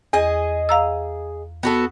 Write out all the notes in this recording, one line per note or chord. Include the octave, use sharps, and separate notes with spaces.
E2 G#4 D#5
F5 A#5 E6
B3 F#4 A4